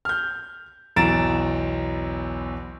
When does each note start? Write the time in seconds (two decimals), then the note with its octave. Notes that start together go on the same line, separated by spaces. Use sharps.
0.05 F6 G6
0.96 B1 E2 A#5 A6 D7 E7